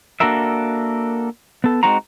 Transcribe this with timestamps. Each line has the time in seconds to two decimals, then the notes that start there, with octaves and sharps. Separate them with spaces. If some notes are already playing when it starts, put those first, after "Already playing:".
0.20 A#3 D4 F#4 A4 A#4 E5
1.64 B3 A4
1.83 G#3 C4 D#4 F#4 A#5